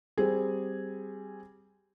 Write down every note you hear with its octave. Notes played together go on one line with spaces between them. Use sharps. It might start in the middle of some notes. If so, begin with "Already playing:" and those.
G3 C4 G#4